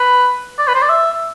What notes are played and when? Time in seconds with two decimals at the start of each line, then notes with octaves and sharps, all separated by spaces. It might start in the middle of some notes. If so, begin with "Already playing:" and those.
Already playing: B4
0.58 D5
0.68 B4
0.75 C5
0.82 D5
0.89 E5